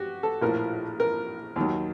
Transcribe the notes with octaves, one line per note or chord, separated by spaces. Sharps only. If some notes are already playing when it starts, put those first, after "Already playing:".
Already playing: F#4 G4
A4
A#1 A2 F3 A#4
A#4
D#2 D#3 F#3